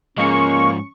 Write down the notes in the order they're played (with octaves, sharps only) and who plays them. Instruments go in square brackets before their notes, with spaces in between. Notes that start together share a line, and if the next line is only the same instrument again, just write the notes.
[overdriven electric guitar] G#2 F3 [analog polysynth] G#3 A#3 [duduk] C#4 [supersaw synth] C#6